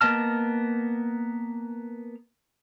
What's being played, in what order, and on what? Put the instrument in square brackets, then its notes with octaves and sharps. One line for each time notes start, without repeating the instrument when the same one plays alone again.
[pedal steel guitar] A#3 B3 D#5 A5 F6